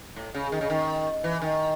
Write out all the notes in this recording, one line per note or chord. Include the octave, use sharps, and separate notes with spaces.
A2
C#3
D#3
C#3
D#3
E3
D#3